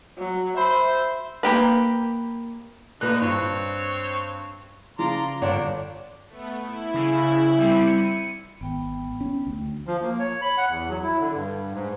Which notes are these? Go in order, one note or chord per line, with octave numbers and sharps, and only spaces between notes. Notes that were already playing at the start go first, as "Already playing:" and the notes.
F#3
C5 E5 B5
A#3 G4 B4
A#2 D3 D#4 B4 F#6
G2 C4 C#5
C#3 F3 D5 A#5 C6
G1 D4 C#5 D5
A3 B3
E4
C#3
G3 C4
C#7 D#7
G#1 B3 G5
C#4
D2
F3
A#3
C#5
B5
F#5
E2
F#3
E4
D3
G2
G#2